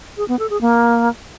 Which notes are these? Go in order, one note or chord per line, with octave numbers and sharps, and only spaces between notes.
G#4
B3
A4
G#4
A#3